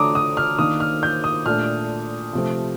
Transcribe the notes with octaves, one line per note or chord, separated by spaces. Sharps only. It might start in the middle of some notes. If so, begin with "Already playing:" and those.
Already playing: D3 A3 D4 A#5 D6 D#6
D#6
F6
D#3 A#3 D4 D#6
F6
G6
D#6
A#2 A3 D4 F6
C3 F3 A3 C4